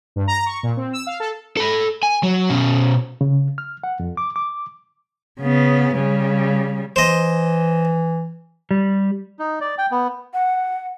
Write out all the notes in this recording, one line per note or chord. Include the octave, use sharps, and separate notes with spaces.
G2
A#5
C#6
A#2
C4
E6
F5
A4
A4 B5
G#5
F#3
B2 C#4
C#3
F6
F#5
F2
D6
D6
C#3 B3
C#3 G3
E3 C5 D#5
G3
D#4
D5
G5
B3
F#5